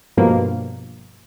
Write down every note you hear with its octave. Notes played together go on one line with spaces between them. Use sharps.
G2 B2 F3 A#3